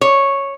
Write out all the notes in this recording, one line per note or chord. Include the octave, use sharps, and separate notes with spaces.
C#5